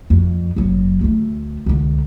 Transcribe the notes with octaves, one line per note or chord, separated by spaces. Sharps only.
F2
F#1 F#3
D2 A3
C#2 D3